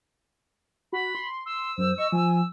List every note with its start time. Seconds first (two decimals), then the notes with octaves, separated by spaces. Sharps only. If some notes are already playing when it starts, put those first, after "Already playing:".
0.93 F#4 B5
1.15 C6
1.46 C6 E6
1.78 F#2 C5
1.98 D#5 C#6
2.12 F3 G#5